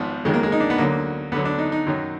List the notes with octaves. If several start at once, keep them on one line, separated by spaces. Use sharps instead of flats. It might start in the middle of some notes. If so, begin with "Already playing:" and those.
Already playing: G#1 G#2 F3 B3
F2 D#3 F#3 G#3
A#3
G#3
D#4
D4
B3
D2 D3 F#3 A#3
D2 D3 F#3 B3
D4
D#4
D#4
F#2 D#3 F#3